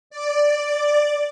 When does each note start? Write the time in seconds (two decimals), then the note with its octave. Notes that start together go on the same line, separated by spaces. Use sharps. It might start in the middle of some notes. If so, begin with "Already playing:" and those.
0.10 D5